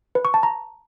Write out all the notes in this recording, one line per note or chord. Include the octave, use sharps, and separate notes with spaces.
B4
C#6
A5
A#5